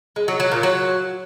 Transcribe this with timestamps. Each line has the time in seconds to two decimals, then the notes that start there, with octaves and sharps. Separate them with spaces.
0.16 G#3
0.28 F#3
0.40 F#3
0.51 A#2
0.63 F#3